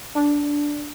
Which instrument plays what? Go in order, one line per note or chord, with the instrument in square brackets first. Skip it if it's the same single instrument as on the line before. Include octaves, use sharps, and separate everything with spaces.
[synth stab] D4